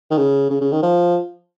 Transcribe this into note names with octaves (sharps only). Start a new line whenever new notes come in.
D#3
C#3
C#3
C#3
D#3
F3